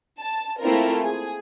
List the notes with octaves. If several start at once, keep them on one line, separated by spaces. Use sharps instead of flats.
A5
A3 A#3 C4 E4 F4 A#4
G#4